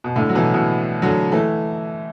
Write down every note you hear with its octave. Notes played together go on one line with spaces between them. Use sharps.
B2
A2 D3
F#3
B2 E3
B2 E3
D3 F#3
E3 A3